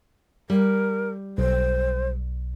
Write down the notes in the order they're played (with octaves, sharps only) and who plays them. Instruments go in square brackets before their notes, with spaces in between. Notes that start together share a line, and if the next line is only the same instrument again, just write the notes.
[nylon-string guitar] G3 [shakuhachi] A#4
[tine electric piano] B1 [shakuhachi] C5